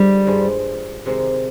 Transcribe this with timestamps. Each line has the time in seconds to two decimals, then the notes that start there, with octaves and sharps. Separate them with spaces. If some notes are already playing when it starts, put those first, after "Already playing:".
Already playing: D3 F3 G3 G#3 D4
0.26 G2 F3 G#3
1.06 C3 D#3 G#3 C4